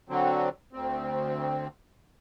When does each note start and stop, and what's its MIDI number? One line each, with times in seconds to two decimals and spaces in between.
0.09 0.49 50
0.09 0.49 54
0.09 0.49 60
0.73 1.68 38
0.73 1.68 60